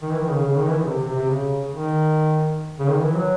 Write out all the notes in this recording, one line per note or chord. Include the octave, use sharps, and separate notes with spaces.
D#3
E3
D#3
C#3
C#3
D#3
E3
D#3
C3
C3
C3
C#3
D#3
C#3
D#3
E3
F#3